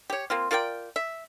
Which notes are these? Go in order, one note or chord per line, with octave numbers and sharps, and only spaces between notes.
G4 C#5
A#3 C4 F4
F4 A#4 D5 G5
E5